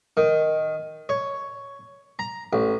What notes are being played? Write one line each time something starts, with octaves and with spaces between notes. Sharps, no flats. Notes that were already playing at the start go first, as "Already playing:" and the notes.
D#3
C#5
A#5
A1